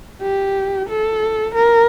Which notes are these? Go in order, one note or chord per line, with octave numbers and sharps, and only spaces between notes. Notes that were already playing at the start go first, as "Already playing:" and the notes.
G4
A4
A#4